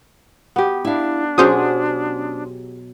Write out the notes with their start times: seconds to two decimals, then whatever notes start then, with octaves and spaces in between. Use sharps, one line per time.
0.56 B3 G4
0.85 D4 E4 F5
1.38 B2 F#3 C#4 G4 G#4 C5 D#6